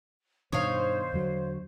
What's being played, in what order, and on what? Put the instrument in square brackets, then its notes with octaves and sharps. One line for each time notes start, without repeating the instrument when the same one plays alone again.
[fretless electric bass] G2 B2 D#3 [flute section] C5 [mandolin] C#5 D#5 F5
[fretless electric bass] E2 D3 F#3